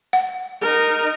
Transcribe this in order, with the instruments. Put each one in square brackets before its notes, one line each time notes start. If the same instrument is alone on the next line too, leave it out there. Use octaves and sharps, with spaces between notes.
[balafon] F#5
[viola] D#4 A#4